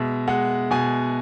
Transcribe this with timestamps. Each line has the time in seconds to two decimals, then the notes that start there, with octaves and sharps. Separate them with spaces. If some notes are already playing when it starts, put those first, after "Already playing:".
Already playing: B2 G#3 E5
0.28 G#3 F#5
0.71 B2 G#5